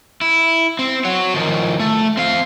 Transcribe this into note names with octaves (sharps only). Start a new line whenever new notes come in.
E4
C4
F#4 C#5
D#3 F3
A3
C4 F5